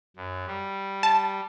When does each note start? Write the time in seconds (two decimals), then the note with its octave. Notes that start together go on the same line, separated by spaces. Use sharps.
0.16 F#2
0.47 G3
1.03 A5